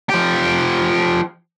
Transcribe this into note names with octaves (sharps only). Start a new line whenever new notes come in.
F3 G4